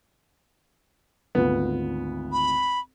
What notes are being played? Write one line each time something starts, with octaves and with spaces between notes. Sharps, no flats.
G#1 D2 B3 F4
B5